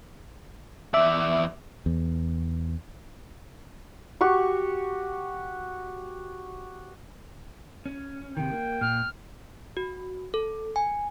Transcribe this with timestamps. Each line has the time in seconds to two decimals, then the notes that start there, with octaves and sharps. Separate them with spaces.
0.94 E2 D5 E5
1.86 E2
4.21 F#4 G4 C#6
7.86 C#4
8.37 C3 D#3 G5
8.52 A#3
8.81 A#2 F6
9.77 F#4
10.34 A4
10.76 G#5